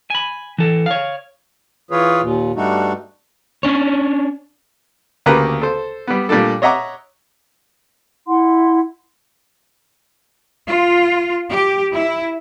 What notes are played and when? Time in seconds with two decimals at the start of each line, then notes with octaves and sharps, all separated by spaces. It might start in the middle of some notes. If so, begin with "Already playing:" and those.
0.10 G#5 B5
0.58 E3 A4
0.86 C#5 F5
1.91 E3 F4 G#4 B4 C#5
2.21 D#2 A#2
2.56 G2 G3 A3 D4 D#4 F#4
3.63 C#4 D4 C#5
5.26 D2 C#3 A#3 G4 B4 A#5
5.62 A4 C5
6.08 G3 B3
6.29 A#2 G3 A3 D4 A4
6.62 C#5 D#5 E5 F#5 A#5 D6
8.27 E4 F#5 C6
10.67 F4
11.50 G4
11.94 E4